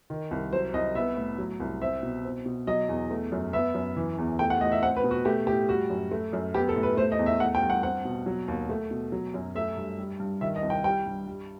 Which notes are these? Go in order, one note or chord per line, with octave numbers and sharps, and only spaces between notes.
D#3
C2
F#3 C5
C2 D#5
B3 E5
A2
F#3
C2
C4 E5
B2
C4
B2
F#3 D#5
E2
A3
F#2
B3 E5
F#2
E3
E2
A3 G5
F#5
A2 D#5
E5
C4 F#5
B4
B2
F#4
A3 G4
A2 G4
G3 F#4
F#2
A3
F#2
B3 G4
A4
A2
B4
A3 C5
D#5
E2
E5
A3 F#5
G5
G2
F#5
C4 F#5
B2
F#3
D#2
A3
B2
F#3
F#2
A3 E5
G2
G3
G2
D#3 E5
D#5
C2
G5
G3 G5
G2
G3